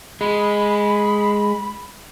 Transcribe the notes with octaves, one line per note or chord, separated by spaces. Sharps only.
G#3 B5